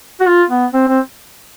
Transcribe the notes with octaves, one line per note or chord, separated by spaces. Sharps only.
F#4
F4
B3
C4
C4